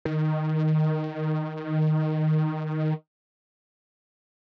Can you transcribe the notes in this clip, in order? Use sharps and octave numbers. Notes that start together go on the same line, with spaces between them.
D#3